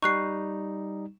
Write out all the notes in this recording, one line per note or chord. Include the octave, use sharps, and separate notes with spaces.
G3 D#4 C#6 F#6 C7